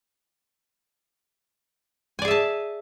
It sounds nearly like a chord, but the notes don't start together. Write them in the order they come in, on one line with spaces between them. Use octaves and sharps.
G#5 D5 G#4 E5 A5